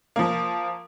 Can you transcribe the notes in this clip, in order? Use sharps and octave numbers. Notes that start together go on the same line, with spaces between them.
F3 A#3